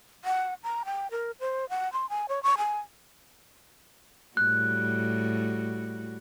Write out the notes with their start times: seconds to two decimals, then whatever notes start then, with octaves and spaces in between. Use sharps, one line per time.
0.25 F#5
0.64 A#5
0.85 G5
1.11 A#4
1.40 C5
1.69 F#5
1.93 C6
2.09 G#5
2.29 C#5
2.43 C#6
2.58 G#5
4.37 A2 G3 F#4 F#6